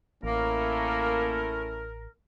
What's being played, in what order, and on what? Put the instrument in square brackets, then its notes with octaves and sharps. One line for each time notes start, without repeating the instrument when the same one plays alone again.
[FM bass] A1 [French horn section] A3 C#4 E4 [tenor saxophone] A#3 [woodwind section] A#4